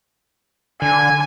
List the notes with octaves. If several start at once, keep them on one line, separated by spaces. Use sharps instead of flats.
D3 G#5